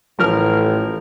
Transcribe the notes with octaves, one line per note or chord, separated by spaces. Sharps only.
A1 F3 A#4 F6